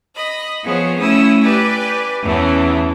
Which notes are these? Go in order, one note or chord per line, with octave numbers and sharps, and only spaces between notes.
D#5 B5
F3 B3 G#4 C5 C#5
A3 C#4 E4 D#6 E6
G4 B4 D5 G#5
E2 E3 A3 C#4